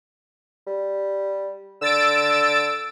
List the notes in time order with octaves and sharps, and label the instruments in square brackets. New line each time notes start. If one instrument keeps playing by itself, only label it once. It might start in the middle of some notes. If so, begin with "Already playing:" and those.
[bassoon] G3
[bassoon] D3 [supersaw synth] E6 A6 D7